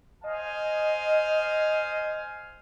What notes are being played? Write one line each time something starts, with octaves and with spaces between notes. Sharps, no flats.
C5 D#5 F5 G#5